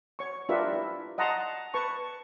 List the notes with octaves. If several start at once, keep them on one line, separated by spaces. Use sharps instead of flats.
C#5 C#6
D4 F4 G4 A#4 B4 E5
E4
D#5 F#5 A5 A#5 C6
B4 A5 C#6